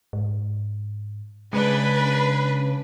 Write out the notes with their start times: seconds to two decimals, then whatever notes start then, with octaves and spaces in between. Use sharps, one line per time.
0.13 G#2
1.53 C#3 G#3 D4 B4